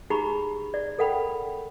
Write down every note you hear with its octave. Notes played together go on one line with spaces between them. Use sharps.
D#4 G4 G#4 A#5 B5 C#6
D5
A4 A#4 F#5 G5 B5